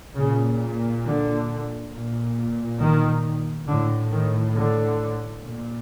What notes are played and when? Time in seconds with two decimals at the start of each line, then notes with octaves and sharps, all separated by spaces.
0.16 A#2 C#3
1.04 D3
1.92 A#2
2.79 D#3
3.67 A2 D3
4.11 D#3
4.56 D3
5.43 A#2